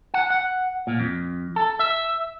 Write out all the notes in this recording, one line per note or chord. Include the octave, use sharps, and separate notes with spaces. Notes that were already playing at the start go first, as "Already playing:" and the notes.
F#5
F#5
A#2
F2
A4
E5